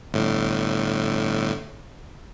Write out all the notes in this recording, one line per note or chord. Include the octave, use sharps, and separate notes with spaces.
G1 A2